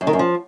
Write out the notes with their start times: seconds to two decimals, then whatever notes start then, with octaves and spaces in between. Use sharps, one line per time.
0.01 F#2
0.07 D#3
0.13 F#2
0.19 F3